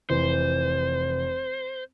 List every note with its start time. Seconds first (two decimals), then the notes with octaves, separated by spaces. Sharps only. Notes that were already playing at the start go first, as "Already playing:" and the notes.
0.10 F1 E3 C5